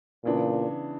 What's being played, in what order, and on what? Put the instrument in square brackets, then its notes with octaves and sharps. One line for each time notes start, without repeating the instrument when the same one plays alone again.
[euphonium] A#2 [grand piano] C#3 E3 B3 D4